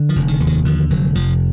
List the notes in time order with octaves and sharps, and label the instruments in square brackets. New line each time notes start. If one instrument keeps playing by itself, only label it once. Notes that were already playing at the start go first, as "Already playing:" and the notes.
Already playing: [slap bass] D3
F3
F1
D#3
D#2
D#3
D3 F3
F1 F#3
F1 F3